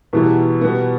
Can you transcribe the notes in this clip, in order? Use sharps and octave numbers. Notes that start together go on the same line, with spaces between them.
E2 B2 G3 B3 E4
B2 G3 B3